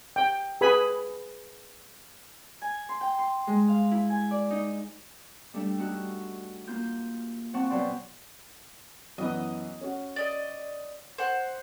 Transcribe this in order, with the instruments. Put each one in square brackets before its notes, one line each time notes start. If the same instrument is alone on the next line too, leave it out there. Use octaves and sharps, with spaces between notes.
[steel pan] G5
G#4 B4 G#5 B5
[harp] G#5
C6
G5
C6
G#3
F5
E4
G#5
D5
D#4
G3 A3 D4 E5
A3 D#4 F#4 A5 F#6
A#3 F4 G6
F3 C4 F#5 A5 C#6
B2 F#3 C5 D5 A5 C6
[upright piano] F#2 E3 B3 [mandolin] D#5
[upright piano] C#4 F#4
[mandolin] D5 D#5
C5 F#5